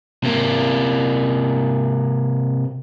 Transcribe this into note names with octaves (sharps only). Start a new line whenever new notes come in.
C3 A#3